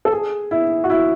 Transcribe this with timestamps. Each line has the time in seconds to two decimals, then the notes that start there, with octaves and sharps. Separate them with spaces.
0.05 A4
0.12 G#4
0.51 E4
0.84 F#4
0.90 E4